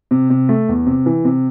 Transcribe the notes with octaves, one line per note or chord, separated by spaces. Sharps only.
C3
C3
A3
E2
C3
E3
C3